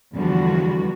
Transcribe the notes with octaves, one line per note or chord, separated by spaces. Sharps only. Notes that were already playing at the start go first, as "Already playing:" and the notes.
E2 D3 F3 G3 F#4